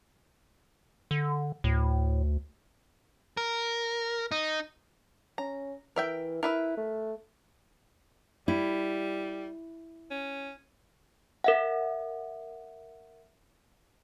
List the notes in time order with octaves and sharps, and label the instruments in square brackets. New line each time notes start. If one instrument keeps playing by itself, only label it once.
[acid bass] D3
[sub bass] D2 [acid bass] A2
[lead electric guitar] A#4
D#4
[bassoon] C#4 [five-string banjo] A#5
[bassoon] E3 [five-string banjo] A#4 E5 G5
[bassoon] E4 [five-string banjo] A#4 B4 E5
[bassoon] A3
[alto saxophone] G3 [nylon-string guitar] E4
[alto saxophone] C#4
[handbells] A#4 E5 F#5